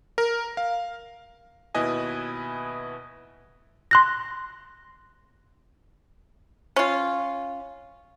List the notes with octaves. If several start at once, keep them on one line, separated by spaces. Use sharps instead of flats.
A#4
F5
D#2 B2 E4 B4 D#5 G#5
C6 F#6 A#6
C#4 F4